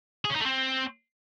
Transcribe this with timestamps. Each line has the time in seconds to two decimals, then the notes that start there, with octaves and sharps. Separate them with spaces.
0.25 G#4
0.30 C#4
0.35 D#4
0.41 A3
0.46 C4